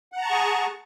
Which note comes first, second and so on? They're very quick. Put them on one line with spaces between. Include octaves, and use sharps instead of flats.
F#5 A#5 A5 C#6 G#4